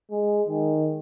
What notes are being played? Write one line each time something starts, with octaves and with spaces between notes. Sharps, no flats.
G#3
D#3